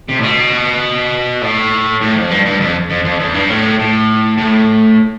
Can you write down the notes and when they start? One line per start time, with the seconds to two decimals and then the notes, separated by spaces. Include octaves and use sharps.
0.09 C3
0.19 A2
0.23 B2
1.42 A2
2.01 A2
2.15 F2
2.30 G2
2.45 G2
2.60 F2
2.90 F2
3.04 F2
3.20 E2
3.34 G2
3.49 A2
3.79 A2
4.38 A2